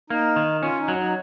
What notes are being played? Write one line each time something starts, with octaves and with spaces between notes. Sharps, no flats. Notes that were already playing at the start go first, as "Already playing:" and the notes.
A#3 D#4
D#3
C#4 F4
D#4
F#3
D#4